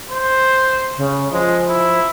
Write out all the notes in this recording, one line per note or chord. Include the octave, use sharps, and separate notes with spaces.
C5
C#3
F3 G#3
E4